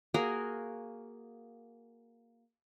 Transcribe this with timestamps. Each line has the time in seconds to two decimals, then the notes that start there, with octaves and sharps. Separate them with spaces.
0.14 A#3 F#4 G#4 A#4